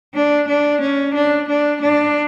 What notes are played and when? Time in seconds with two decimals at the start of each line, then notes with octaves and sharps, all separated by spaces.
0.14 D4
0.48 D4
0.81 C#4
1.14 D4
1.49 D4
1.82 D4